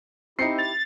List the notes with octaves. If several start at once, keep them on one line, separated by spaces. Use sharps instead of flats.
C4 D#4 E4 G4 C7 C#7
A6 F7